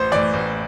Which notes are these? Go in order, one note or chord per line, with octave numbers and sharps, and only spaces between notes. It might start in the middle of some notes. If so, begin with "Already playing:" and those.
Already playing: A1 C5
A2 E3 D5
A1